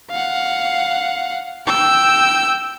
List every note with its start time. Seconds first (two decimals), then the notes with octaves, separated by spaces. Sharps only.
0.10 F5 F#5
1.66 G5 E6